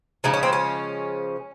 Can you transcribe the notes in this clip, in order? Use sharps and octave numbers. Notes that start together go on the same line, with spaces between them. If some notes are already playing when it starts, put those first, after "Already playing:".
C#3 F3 G#3 D#4
C#4
C4
C#4